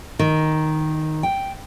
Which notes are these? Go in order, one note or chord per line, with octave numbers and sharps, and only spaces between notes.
D#3
G5